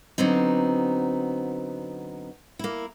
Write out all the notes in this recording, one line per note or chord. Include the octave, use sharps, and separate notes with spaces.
D3 F#3 B3 C4 D#4
A#3 E4